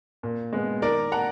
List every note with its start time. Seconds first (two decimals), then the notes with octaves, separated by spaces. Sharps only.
0.23 A#2
0.53 G#3 B3
0.82 D#3 A#4 D5
1.12 A#3 F#5 A#5